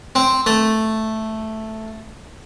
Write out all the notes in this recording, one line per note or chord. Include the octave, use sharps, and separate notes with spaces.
C4
A3